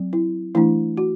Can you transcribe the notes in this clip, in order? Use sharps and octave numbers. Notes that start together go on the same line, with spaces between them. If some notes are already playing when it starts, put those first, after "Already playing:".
Already playing: F#3 C4
E4
E3 A3 D4 E4
F#4